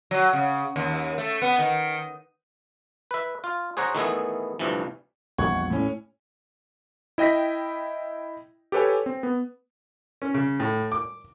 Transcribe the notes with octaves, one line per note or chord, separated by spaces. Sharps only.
F#3
C#3
D#2
A3
B3
D#3
B4 E5
F4
G#4 C5 C#5 F#5 A#5
D#3 E3 A3 B3 E4 G#4
D2 G2 C3 E3 F3
A#1 E2 G3 F#5 C#6 G#6
A2 C#4
E4 D#5 G5 A#6 B6
G4 A4 B4 C#5 G#5
C4
B3
C#4
C#3
A2
D6